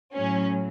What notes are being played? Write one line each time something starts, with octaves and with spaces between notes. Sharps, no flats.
A2 F#3 C#4